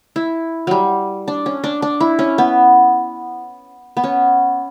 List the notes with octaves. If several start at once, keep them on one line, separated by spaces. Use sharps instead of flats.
E4
F#3 G3
D4
C#4
D4
D4
E4
C#4
B3
B3
C#4